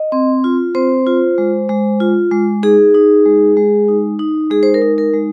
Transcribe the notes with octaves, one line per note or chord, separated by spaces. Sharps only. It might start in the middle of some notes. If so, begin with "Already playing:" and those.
Already playing: D#5
C4
F4
C4 C5
F4
G#3
G#3
F4
G#3
D#4 G#4
D#4
G#3
G#3
D#4
D#4
G#3 G#4
C5
A#4
D#4
A#4
G#3